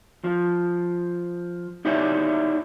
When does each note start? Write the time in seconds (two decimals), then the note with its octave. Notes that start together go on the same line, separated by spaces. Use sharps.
0.24 F3
1.85 D#4 E4 G4 C#5 D5 E5